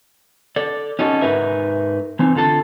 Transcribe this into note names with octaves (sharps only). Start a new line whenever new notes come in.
A4 D5
C#4 D#4 F#4 A4
G#2 D#4 A#4 B4 E5
E3 C4 D#4
D3 F4 A4 A5